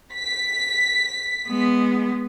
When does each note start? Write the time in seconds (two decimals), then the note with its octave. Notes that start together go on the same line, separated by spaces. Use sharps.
0.15 B6
1.49 G#3 B3